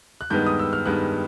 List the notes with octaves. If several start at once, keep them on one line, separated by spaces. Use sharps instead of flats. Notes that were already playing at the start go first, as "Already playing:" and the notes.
F#6
G2 D#3 G#3 B3 G6
D#6
E6
F6
G2 D#3 G#3 B3 F#6